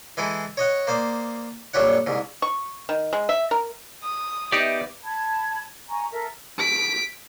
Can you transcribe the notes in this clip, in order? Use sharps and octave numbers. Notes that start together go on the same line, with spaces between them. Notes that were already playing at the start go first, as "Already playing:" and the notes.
E3 G#3 E4 G#4 A4
C#5 D#5 F#5
A#3 C5 D5 D#6
A#1 F#2 G3 G4 C#5 F#5
C2 G#2
C#6
D#3
G#3
E5
A#4
D#6
B3 D#4 G4 D5 E5
A5 B5 G#6
G#5 A#5 C#6
A4 A#4 E5
B6 D7